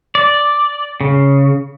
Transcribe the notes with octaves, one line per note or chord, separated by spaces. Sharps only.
D5
C#3